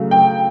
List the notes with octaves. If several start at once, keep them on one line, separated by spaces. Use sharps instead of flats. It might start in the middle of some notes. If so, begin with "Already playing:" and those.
Already playing: C#3 F#3 A3
G5